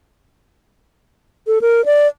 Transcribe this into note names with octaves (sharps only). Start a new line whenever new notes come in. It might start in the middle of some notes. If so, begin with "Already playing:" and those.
A4
A#4
D5